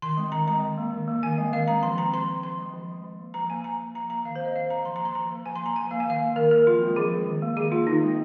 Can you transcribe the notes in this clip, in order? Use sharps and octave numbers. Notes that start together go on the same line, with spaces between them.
D#3 C6
G#3 C4
D#3 A#5
G#3 C4 A#5
D#3
A#3
D#3
A#3
D#3 G#5
G#3 C4
D#3 F5
G#3 C4 A#5
F3 C6
C4 A#5
F3 C6
C4
F3 C6
G#3 C4
F3
G#3 C4
F3
A#3
F3 A#5
A#3 G#5
F3 A#5
A#3
F3 A#5
A#3 A#5
D#3 F5
C5
C4 D#5
D#3 F5
C4 A#5
F3 C6
A#5
A#3 C6
F3 A#5
A#3
F3 G#5
C6
A#3 A#5
F3 G#5
A#3 F5
G#5
D#3 F5
A#3
D#3 A#4
A#3 A#4
F3 F4
G#3 C4
F3 G#4
G#3 C4
D#3
A#3
D#3 G#4
A#3 F4
D#3 D#4
G#3 C4